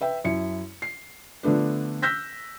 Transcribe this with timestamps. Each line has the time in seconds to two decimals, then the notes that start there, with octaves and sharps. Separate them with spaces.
0.01 B4 E5 G5
0.24 F#2 E4 C#7
0.82 C7
1.43 D3 F3 A3 B3 D4
2.02 E6 F#6 G6 A#6 B6